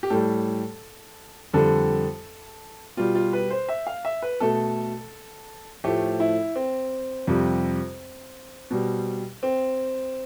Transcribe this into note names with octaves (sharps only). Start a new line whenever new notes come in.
G4
A2 G3 A4
F2 D3 G3 A4
B2 G3 F4
F4
B4
C5
E5
F5
E5
B4
B2 A3 A4
A2 F3 A3 G4
E4
C4
F2 C3 G3
B2 G3
C4